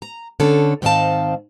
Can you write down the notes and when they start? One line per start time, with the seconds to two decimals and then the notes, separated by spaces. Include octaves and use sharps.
0.02 A#5
0.40 D3 C#4 A4
0.82 G#2 D#3 C4 G4 F5 A5